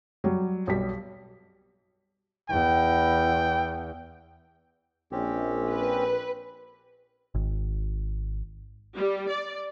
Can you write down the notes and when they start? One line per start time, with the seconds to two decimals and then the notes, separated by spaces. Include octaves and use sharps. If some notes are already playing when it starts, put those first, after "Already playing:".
0.24 F#3 G3
0.67 B1 G3 B6
2.50 E2 G5
5.12 A#1 C4 C#4 G4
5.69 B4
7.35 G#1
8.96 G3
9.30 D5